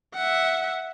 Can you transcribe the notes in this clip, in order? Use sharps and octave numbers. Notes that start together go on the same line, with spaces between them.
E5 F#5